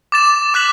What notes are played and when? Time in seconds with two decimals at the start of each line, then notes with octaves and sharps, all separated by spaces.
0.12 D6 A6 E7
0.54 D6 F#6 B6 F#7